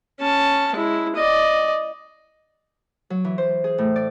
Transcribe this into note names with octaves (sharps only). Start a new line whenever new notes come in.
C#4 A5
G#3 E4
D5 D#5
F#3
E3
C5
G#4
A2
D5